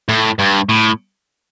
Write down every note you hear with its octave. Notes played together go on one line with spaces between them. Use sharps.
A2
G2
A2